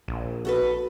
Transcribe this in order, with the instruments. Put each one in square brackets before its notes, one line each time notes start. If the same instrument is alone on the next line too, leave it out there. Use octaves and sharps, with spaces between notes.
[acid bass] A#1
[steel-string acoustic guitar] F#4 A4 B4